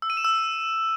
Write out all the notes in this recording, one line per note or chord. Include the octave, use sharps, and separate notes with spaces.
E6
D#7
E7
E6